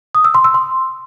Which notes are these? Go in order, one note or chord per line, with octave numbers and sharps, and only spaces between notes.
D#6
E6
C6
E6
C6